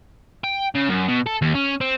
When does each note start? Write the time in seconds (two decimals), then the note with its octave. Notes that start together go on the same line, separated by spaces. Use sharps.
0.44 G5
0.75 C#3
0.89 F#2
1.08 B2
1.27 A4
1.42 D#2
1.55 C#4
1.81 C4